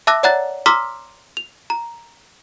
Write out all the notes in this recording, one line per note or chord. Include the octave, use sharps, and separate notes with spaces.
E5 A5 D6 E6 F#6 A#6
C#5 D5 F#5 A#5 F#6 A6
A#5 C6 D6 E6 F6 B6
F7
A#5